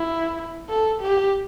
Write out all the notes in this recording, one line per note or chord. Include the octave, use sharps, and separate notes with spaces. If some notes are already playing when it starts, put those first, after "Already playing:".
Already playing: E4
A4
G4